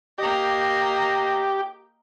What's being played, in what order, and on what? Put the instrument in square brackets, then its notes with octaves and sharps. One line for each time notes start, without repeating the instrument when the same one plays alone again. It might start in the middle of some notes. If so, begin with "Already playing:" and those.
[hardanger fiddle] A#3 D#5 [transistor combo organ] G4